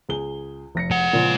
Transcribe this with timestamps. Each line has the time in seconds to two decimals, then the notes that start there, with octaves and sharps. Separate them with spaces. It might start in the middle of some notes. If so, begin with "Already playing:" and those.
0.09 C#2 G#4 G7
0.75 F1 A#6 C#7
0.91 G#3 F#5
1.13 A#2 C#3 F3